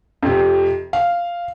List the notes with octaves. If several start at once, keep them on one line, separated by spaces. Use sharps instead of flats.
F2 C3
F5